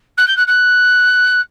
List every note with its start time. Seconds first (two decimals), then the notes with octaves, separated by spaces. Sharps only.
0.17 F#6
0.27 G6
0.36 F#6
0.47 F#6